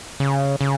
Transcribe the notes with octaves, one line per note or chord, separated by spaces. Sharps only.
C#3
C#3